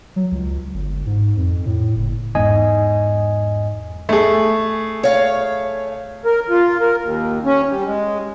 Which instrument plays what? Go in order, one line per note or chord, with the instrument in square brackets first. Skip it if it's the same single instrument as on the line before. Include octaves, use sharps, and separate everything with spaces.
[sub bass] F#3
C#2
G1
G#2
F2
A2
F#1
[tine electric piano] E2 G#2 D#5 G#5
[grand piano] A3 G#4
[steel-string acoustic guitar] C#5 F5
[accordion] A#4
F4
A#4
D#2
C#4
G3
G#3